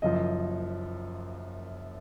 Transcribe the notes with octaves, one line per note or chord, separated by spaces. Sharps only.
F#1 F#2 F3 D#5